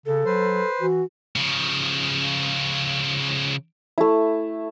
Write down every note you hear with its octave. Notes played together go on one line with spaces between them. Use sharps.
C#3 A4
F#3 B4 C5
E3 F#4
C#3 F3
A3 E4